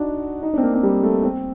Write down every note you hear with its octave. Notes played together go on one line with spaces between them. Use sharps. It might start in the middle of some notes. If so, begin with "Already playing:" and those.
Already playing: D4 D#4 F#4
D#4
D4
C4
A#3
C4
G3
A3
C4